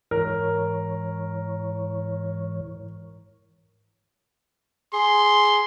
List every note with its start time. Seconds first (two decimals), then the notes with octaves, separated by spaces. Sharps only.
0.11 G#2 E3 A#4 C#5
4.93 G#4 C6